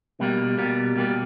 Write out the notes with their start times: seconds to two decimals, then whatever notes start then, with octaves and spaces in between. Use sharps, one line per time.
0.20 B2 G3 A#3
0.58 B2 G3 A#3
0.96 B2 G3 A#3